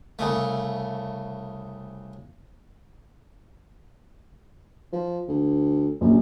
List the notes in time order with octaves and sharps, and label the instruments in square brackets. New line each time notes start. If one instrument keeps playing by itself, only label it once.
[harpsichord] C2 C#3 A3
[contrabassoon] F3
D2
[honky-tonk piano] A#1 [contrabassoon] F#2